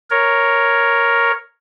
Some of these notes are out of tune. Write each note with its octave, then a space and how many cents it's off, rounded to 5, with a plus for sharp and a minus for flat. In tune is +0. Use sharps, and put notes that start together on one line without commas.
A#4 +0 C#5 +0